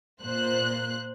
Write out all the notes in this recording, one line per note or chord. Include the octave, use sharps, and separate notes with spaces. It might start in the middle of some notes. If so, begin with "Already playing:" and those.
A#2 C5 F#6